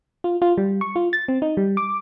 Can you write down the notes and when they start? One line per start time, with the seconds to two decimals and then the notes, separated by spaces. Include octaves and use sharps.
0.24 F4
0.42 F4
0.58 G3
0.81 C#6
0.96 F4
1.13 A6
1.28 C4
1.42 D#4
1.57 G3
1.77 D6